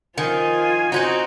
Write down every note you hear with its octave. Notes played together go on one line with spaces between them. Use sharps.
D#3 F3 F4 G#5
C4 C#4 D#4 F#4 C5